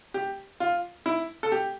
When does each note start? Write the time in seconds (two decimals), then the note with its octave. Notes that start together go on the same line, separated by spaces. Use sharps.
0.14 G4
0.60 F4
1.06 E4
1.43 A4
1.52 G4